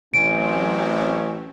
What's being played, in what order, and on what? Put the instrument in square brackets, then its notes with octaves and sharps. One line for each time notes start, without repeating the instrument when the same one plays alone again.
[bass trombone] A1 [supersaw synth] F#3 A3 C4 [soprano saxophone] C#4 [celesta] D7